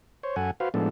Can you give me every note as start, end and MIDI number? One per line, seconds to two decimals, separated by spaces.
0.23 0.36 72
0.23 0.36 73
0.36 0.51 42
0.36 0.51 69
0.36 0.51 78
0.36 0.51 80
0.60 0.69 66
0.60 0.69 71
0.60 0.69 72
0.60 0.69 77
0.74 0.89 45
0.74 0.89 53
0.74 0.89 56
0.74 0.89 59
0.74 0.89 62
0.74 0.89 69